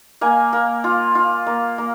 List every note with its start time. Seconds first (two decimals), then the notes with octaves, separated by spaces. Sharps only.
0.21 A#3 G#5
0.53 A#3
0.84 F4
1.15 F4
1.46 A#3
1.78 A#3